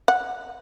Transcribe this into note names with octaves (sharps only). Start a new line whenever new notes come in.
F#5